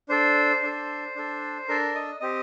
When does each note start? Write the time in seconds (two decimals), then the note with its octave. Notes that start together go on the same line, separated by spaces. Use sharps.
0.09 D4 A4 C5
0.62 D4 A4
1.15 D4 A4
1.68 D4 A4 A#4
1.95 D#5
2.21 C4 G4 D#5